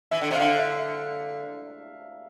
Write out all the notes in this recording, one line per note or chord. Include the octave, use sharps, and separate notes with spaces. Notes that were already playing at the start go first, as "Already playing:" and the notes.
E3 E5
D3
C3
D3 F5
E5